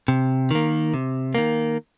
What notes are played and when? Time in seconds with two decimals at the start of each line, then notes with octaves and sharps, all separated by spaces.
0.08 C3
0.51 D#3 A#3
0.94 C3
1.35 D#3 A#3